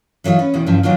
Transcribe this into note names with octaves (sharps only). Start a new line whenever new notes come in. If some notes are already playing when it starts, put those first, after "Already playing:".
E3 F#3 D#4 F4
C#4 B4
E2 B2 D#3 E3
G2 C#3 E3 F3
D#3 F#3 B3 D4 F4